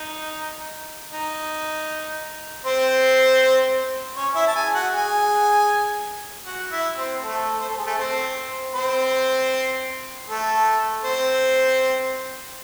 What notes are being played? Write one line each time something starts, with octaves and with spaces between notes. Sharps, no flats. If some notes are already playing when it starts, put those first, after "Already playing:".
Already playing: D#4
D#4
C4 C5
C#4 C#5
E4 E5
A5
G#4 G#5
F#4 F#5
G#4 G#5
F#4 F#5
E4 E5
C4 C5
A3 A4
C5
A4
G#4
A3 A4
C4 C5
C4 C5
A3 A4
C4 C5